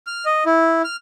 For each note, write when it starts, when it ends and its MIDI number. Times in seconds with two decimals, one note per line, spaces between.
0.07 0.25 89
0.26 0.44 75
0.46 0.82 64
0.85 0.96 89